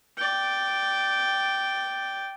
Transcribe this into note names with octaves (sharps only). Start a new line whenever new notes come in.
D5 G5